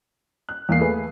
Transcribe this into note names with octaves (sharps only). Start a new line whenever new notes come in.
F#6
E2 A#3 C7
A3 G#4 B4